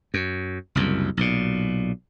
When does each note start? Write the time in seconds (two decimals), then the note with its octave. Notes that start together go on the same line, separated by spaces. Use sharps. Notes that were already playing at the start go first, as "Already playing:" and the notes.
0.14 F#2
0.75 F#1 C2 F#2
1.17 B1 A#2